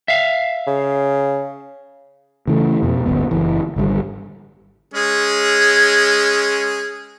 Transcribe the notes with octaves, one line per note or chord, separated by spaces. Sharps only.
E5 F5
C#3
C#3 E3 A3
F2 B2
D1 G1 B3
F#1 E3
G#1 D3 F3 G3
G#3 C#4 G#4